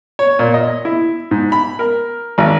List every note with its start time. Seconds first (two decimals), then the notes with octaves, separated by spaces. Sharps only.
0.19 C#5
0.39 A#2
0.54 D#5
0.85 E4
1.31 G#2
1.52 B5
1.79 A#4
2.38 G#1